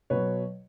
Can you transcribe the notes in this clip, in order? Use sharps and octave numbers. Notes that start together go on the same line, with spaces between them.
B2 F#3 B4 C#5